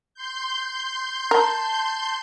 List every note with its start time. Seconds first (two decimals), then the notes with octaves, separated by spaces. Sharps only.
0.14 C6 G6
1.31 A#4 A5